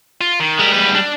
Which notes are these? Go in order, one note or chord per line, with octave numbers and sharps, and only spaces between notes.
F4
D#3
G3 G#3 A#4
E2 B4
D4